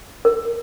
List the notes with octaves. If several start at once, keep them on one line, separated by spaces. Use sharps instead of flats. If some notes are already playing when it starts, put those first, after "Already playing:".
A#4